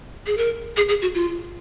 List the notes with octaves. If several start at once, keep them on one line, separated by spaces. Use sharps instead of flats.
G#4
A#4
G#4
G#4
F#4
F4